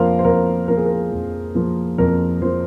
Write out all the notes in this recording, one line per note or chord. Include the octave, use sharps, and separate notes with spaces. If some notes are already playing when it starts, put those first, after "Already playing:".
Already playing: F2 F3 A#3 A#4 C5 F5
C5
F2 A#4
F3 A#3 A#4
G#4
A#4
F2
F3 A#3
F2 A#4
F3 A#3 C5